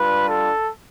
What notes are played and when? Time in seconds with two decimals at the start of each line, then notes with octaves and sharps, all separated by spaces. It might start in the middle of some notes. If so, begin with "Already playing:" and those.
Already playing: G3 D4 F4 B4
0.28 A4